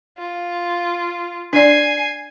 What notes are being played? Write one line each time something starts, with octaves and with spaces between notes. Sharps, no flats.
F4
D4 D5 G#5 C7